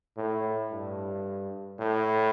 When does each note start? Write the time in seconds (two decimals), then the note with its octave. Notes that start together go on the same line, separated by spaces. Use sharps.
0.17 A2
0.72 G2
1.80 A2